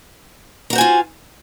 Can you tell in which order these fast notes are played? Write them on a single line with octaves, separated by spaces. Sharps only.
A#5 F#4 C5 G#5 F4